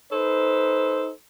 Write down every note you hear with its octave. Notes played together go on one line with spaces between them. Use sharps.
D#4 A4 B4 C5